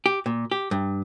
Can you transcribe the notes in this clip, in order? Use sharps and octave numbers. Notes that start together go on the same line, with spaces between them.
G4
A#2
G4
G2